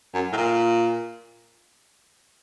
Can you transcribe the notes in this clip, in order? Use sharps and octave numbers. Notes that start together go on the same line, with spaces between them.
F#2
A2
A#2